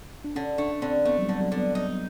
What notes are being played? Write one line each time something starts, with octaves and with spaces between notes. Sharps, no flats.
D4
D3 C#4
A3 D4
D3 C4
A3 B3
F#3
G3
D3
F#3
D3
B3
D#4